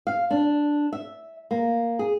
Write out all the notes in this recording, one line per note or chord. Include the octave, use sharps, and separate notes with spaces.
F5
D4
E5
A#3
G#4